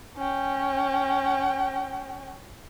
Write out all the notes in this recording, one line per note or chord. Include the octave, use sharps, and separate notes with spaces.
C#4 G5